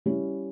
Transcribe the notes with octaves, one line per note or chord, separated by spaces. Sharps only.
G3 C#4 E4